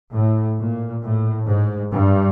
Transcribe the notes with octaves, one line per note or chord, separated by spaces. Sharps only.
A2
A#2
A2
G#2
G2